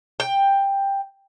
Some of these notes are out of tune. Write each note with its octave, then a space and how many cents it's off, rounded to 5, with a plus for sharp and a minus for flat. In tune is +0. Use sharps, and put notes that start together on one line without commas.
G5 +10